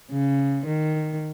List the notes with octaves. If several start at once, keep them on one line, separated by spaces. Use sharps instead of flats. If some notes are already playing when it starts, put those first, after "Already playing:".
C#3
D#3